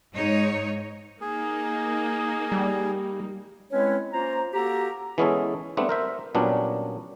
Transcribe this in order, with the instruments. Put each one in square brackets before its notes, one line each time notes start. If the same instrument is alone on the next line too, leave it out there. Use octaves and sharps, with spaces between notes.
[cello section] G#2 D#4 C#5
[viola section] A#3 D#4 [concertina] G#4
[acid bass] G3
[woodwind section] G#3 C4 C#4 E4 B4 C#5
A#3 C#4 F4 C5 A#5
A#3 F#4 G4 A4 A#5
[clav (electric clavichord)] E3 G#3 B3 C#4 G#4 A4
G3 A3 B3 C4 D4
A#4 C5 E5
A#2 F#3 G3 B3 C#4 D4